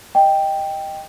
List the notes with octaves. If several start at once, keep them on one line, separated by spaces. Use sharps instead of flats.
D#5 G5